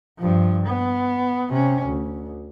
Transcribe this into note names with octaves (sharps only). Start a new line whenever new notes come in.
G2 F3
B3
C3 C#4
D2